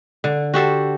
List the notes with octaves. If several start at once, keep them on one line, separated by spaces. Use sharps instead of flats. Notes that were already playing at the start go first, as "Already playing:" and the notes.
D3
F#4 G4 A4 C5